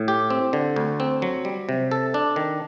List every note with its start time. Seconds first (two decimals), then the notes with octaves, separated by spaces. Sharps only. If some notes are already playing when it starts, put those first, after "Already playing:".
Already playing: A2
0.08 G4
0.30 C4
0.53 D3
0.76 D2
1.00 C4
1.22 F#3
1.45 G3
1.69 C3
1.91 A4
2.14 D4
2.36 D#3